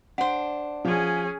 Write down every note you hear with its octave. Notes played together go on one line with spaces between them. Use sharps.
D4 C5 F#5
F3 C#4 G#4